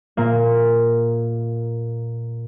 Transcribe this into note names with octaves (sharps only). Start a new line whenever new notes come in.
A#2 A#3